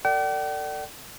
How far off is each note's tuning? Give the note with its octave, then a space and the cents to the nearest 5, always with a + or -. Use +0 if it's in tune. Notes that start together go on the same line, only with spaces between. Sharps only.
A4 +40 D5 +0 G5 -45